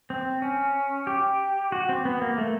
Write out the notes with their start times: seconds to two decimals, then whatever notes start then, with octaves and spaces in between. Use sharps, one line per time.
0.10 C4
0.42 C#4
1.07 G4
1.72 F#4
1.89 C4
2.05 B3
2.22 A#3
2.38 A3